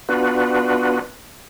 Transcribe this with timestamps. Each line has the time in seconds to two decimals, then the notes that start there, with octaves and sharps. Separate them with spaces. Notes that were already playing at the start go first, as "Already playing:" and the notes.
0.09 B3 D4 F4 F#4 B4